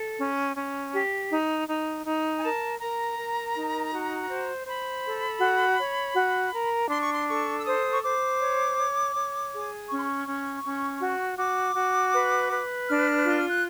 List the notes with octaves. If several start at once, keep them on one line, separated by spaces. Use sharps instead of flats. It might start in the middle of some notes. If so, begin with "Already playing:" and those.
Already playing: A4
C#4
C#4
G4
D#4
D#4
D#4
G#5
A#4 A5
A#4 A#5
A#4
D#4
F#4
C5
C5 B5
A4
F#4
C#5
F#4
A#4
D4 C6
C#6
C6
A4 C#6
E6
C5 D#6
C#6
C5 D6
C#5
C#5
C#5
G#4
C#4 C#6
C6
C#6
C#4
C#4
F#4
F#4 D6
F#4
B4
B4
D4 F6
F4
F6
F#6